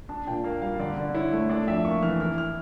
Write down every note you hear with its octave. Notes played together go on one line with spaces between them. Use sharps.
D4 A5
A#2 G5
A#3 F5
G3 F5
D3 D5
D3
E4 C#5
A3
D4 D5
F2 E5
A#3 C#6
E3 F6
E4 F6
F6